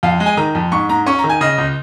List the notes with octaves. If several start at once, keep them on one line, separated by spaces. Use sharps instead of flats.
F2 F5
G#3
G#5
D#3 A#5
F2
G#2 C#6
G#2 A#5
C#4 C#6
A#5
D#3
G#5
C#3 D#5
C#2